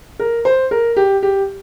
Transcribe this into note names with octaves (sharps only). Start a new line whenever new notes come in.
A#4
C5
A#4
G4
G4